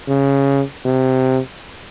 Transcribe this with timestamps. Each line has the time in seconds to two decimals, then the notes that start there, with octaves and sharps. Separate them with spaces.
0.08 C#3
0.85 C3